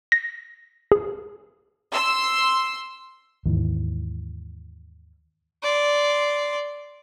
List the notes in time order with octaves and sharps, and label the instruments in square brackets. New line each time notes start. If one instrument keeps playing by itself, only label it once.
[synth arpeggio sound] A#6
G#4
[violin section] C6 E6
[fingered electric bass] D#2 G#2 E3
[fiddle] D5 C6